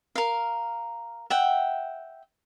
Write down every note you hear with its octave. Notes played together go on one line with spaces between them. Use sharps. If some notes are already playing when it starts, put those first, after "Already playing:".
A#4 F5
E5 F#5 G5